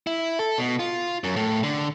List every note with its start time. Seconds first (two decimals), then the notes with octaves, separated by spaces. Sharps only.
0.07 E4
0.39 A4
0.58 B2
0.79 F4
1.24 F#2
1.36 A2
1.63 D3